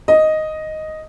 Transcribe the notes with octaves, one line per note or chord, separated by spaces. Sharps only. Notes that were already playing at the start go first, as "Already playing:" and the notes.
D#5